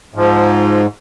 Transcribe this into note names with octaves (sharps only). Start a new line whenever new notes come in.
G#2 F3